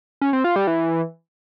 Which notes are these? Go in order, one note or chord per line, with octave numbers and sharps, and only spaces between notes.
C#4
C4
F4
G3
E3